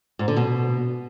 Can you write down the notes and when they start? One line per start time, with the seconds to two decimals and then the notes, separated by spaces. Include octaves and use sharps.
0.19 G#2
0.28 D3
0.37 B2